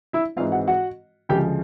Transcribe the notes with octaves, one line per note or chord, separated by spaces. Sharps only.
E4 E5
G#2 E3 G#3 C4 F4 F5
F#4 F#5
F#4 F#5
D2 C#3 F3 G#3 G4 G5